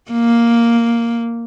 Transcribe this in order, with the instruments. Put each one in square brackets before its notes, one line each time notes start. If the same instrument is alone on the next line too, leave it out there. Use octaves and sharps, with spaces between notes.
[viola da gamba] A#3